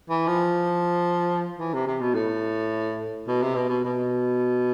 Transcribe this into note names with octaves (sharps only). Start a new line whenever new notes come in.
E3
F3
E3
C3
C3
B2
A2
B2
C3
B2
B2
B2